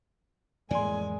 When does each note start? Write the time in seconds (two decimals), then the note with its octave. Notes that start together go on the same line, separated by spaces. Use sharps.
0.71 F2 A2 E3 G#3 A#3 D5 G#5 C6